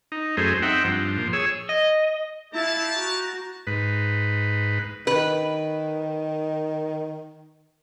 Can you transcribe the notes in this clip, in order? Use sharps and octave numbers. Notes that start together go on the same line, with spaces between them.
D#4
F#2 A3 G#4 C5
C4 D#4 E5 F#5 G5
G2 F3
A#2 F3
G#4 C#5 E6
D#5
E4 G4 F5 A5
F#4 A#5
G#2 B4
D#3 B4